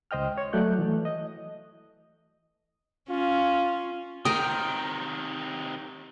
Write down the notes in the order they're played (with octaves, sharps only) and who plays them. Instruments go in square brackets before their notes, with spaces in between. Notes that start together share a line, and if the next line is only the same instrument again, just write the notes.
[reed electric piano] C#2 C5 D#5 G5 F6
C#5
F#3 A3 D5 F#6 G6
E3 A3
D#5
[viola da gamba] C#4 [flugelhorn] F4
[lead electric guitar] C3 D#3 [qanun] A#4 G5 [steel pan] D#6